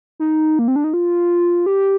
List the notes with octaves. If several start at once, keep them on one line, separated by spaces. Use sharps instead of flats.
D#4
A#3
C4
D4
D#4
F4
G4